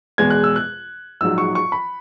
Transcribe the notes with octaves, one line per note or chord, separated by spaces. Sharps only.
E2 B2 G#3 G#6
F#6
E6
F#6
A#1 G#2 F#3 E6
C#6
C#6
B5